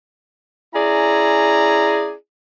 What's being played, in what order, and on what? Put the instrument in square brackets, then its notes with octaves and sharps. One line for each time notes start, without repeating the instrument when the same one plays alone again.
[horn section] C#4 E4 G#4 D5 A#5